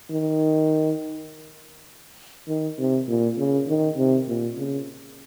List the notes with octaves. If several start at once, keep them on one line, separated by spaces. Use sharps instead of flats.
D#3
D#3
C3
A#2
C#3
D#3
C3
A#2
C#3